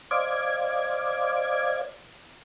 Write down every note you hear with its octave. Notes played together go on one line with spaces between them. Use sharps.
C5 D5 D#5 F5 D6 G#6